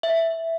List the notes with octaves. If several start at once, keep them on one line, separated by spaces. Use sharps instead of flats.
E5